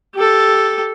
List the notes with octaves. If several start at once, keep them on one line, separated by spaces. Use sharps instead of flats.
G4 A4